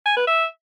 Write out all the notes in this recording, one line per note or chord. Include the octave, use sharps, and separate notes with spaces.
G#5
B4
E5